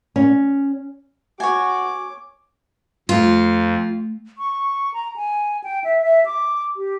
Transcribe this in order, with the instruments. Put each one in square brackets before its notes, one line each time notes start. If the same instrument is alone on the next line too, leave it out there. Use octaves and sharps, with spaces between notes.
[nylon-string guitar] C#4
[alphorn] F#4 [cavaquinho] C#5 G#5 [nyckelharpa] D6
[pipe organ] F2 [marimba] A3 [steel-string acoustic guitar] F4
[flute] C#6
A#5
G#5
G5
E5
E5
D6
G4